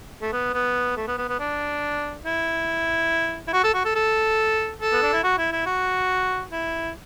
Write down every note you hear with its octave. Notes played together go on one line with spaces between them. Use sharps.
A3
B3
B3
A3
B3
B3
B3
D4
E4
E4
F#4
A4
F#4
A4
A4
A4
B3
D4
E4
F#4
E4
E4
F#4
E4